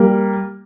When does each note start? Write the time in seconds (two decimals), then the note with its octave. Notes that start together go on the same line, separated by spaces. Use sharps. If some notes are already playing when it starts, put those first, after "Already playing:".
Already playing: G3 A#3